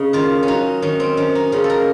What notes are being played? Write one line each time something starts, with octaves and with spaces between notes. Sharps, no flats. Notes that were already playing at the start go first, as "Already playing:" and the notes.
Already playing: C#3 D#4
D#3 F4
C#4
F#3 D#4
D#3 C#4
C4
D#3 C#4
D#4
C#3 F4
A4
A#4